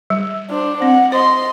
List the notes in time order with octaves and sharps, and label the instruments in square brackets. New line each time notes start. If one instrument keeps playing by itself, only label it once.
[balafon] G3
[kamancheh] D4 C5
[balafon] C4 [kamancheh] F#5
[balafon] C5 [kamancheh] D#5 C6